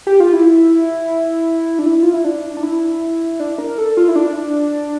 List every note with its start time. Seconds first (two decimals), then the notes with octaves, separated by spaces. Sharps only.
0.07 G4
0.20 F4
0.33 E4
1.79 D4
1.86 E4
2.03 F4
2.14 E4
2.25 D4
2.57 D4
2.63 E4
3.40 D4
3.58 A#4
3.78 A4
3.97 F4
4.08 E4
4.16 D4